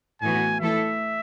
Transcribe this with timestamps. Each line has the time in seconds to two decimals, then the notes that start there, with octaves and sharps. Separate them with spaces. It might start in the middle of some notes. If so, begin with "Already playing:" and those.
0.22 A2 E3 B3 F#4 G#5
0.60 E3 A3 E4 A4 E5